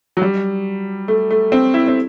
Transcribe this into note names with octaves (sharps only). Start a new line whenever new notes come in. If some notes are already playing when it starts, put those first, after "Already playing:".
F#3
G3
A3
A3
C4
E4
C4